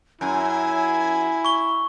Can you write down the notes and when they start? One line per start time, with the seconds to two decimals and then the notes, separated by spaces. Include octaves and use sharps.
0.21 F#2 E4 G#5
1.44 C#6 G7